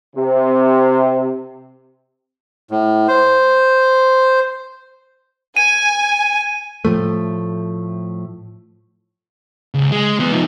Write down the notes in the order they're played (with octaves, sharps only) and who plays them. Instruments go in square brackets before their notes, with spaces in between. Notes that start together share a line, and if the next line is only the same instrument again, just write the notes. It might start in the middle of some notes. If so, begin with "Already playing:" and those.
[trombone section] C3
[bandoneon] A2
C5
[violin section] G#5 [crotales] D#7
[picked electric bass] A2 F3 A3
[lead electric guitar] C#2
G#3
E3 B3
F3 D#4